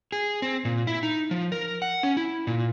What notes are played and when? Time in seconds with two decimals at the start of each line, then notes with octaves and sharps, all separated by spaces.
0.12 G#4
0.42 C4
0.65 A#2
0.87 E4
1.03 D#4
1.31 F3
1.52 A#4
1.82 F#5
2.03 C#4
2.17 E4
2.47 A#2